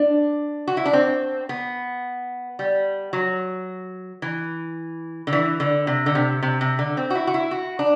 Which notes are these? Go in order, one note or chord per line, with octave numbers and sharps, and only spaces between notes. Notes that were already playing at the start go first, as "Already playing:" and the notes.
Already playing: D4
F#4
E4
D4
C4
B3
G3
F#3
E3
D3
E3
D3
C3
D3
C3
C3
C3
D3
C4
F#4
E4
F#4
E4
F#4
D4